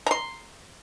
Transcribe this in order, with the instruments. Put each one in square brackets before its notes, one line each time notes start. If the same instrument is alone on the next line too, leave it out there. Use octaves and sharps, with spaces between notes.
[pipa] A#5 C6